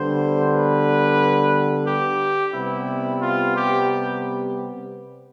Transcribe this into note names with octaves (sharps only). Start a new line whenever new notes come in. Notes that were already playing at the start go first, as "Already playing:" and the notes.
Already playing: D3 G3 B3 C5
B4
G4
C3 G3 B3 E4
F4
G4